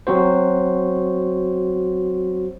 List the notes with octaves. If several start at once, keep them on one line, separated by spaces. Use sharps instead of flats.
F#3 C4 F#4 C5